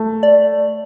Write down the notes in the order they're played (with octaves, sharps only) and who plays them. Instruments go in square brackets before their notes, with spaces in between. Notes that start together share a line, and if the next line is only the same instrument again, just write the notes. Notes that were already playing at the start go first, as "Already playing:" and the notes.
Already playing: [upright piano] A3
[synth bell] D5